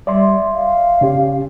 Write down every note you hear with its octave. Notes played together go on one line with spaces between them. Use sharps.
G3 D5 E5 C6
F5
C#3 C#4 G4